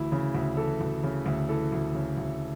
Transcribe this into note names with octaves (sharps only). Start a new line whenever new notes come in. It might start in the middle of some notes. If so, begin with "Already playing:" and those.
Already playing: D2 E3 E4
C#3
D2
E3 A4
D2
C#3
D2
E3 A4
D2
C#3
D2